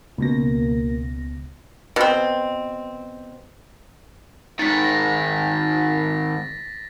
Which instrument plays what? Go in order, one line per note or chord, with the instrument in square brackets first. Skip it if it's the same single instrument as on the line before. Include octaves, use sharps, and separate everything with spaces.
[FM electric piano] C#2 B2 A#6 [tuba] A#3
[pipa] B2 C4
[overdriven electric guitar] G#2 D#3 [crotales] A6 B6
[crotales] A#6